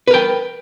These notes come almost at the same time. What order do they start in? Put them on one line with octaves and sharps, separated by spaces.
B4 A#4 G5